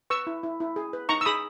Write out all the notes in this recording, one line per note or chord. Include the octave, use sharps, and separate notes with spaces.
B4 C#6 E6
E4
E4
E4
G#4
B4
D#4 A#5 C#6
E6
G#4 B5 D#6